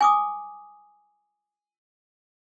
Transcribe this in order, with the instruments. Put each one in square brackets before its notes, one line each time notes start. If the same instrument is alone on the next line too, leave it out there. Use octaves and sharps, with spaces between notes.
[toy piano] G#5 D6 D#6